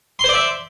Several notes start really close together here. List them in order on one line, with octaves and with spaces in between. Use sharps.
C6 C5 D5 E5